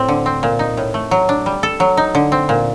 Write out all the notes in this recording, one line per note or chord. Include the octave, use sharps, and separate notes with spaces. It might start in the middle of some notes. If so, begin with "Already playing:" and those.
Already playing: A2 C4
D3
C4
A#2
D#4
A2
A3
F#3
D4
G3
A4
F#3
D#4
D3
C4
A#2